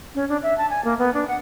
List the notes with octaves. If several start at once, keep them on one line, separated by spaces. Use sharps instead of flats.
C#4
D4
E5
A5
G#5
A#3
B3
D4
F#5